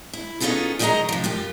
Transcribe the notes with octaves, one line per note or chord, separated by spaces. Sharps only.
E4
B3 C#4 D#4 F4 G#4 A4
D#3 F#3 G4 G#4 D#5 A#5
C3 F3
F#2 F4 G4